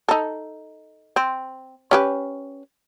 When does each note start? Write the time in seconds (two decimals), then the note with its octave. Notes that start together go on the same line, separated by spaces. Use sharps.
0.08 D#4 A4
1.16 C4
1.91 C#4 G4 B4